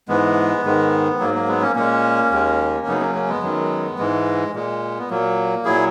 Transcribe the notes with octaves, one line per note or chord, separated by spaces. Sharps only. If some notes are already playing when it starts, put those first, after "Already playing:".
G#2 E3 G#3 B3
G#2 D#3 G#3
G#2 F#3 A#3
A#3
G#3 B3
A#3 C#4
A#2 G#3 A#3 C#4
D#2 D#3 G#3
F#2 C#3 F#3 B3 D#4
A#3 C#4
A#3 C#4
G#3 B3
F#2 D#3 F#3
G#2 E3 G#3
A#2 G#3
B3
A#2 F#3 A#3
A#2 F#3 E4 G#4